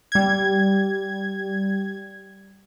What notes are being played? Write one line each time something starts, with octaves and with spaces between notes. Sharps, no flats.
G3 G#6